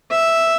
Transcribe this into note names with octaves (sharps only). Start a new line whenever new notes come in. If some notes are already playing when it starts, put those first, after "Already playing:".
E5